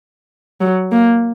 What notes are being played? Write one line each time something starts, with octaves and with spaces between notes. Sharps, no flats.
F#3
A#3